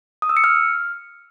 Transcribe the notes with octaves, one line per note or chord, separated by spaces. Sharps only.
D#6
E6
C#7
F6